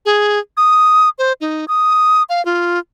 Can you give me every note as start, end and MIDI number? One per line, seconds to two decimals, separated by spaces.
0.06 0.39 68
0.57 1.09 87
1.18 1.33 72
1.41 1.65 63
1.68 2.23 87
2.29 2.44 77
2.45 2.79 65